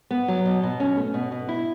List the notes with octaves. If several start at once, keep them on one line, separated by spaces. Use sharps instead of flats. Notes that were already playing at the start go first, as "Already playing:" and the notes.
B3
F#3
B2
B2
C#4
A3
B2
B2
E4